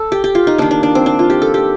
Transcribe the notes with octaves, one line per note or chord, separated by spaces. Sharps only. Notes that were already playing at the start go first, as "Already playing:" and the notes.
Already playing: A4
G4
G4
F4
D#4
D#3 A#3 D4
D4
D4
C4
D4
F4
G4
A4
G4